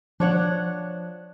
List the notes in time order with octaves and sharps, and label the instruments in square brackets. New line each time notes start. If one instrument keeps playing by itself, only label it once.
[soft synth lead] F3 [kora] D4 C#5 F#5